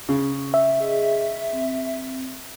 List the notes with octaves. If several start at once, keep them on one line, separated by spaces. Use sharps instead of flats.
C#3
E5
G#4 D#5
C4